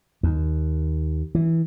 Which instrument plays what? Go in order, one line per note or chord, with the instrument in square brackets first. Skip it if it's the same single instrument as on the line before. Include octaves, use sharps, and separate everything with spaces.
[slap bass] D#2
E3